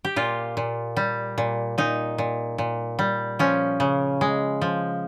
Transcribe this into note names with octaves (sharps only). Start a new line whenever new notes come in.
G4
A#2 F4
A#2
G3
A#2
A#2 D#4
A#2
A#2
G3
F3 C#4
C#3
G#3
F3